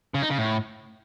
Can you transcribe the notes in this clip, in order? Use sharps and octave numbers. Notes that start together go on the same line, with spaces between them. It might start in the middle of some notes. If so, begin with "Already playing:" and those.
C#3
D#4
C#3
A2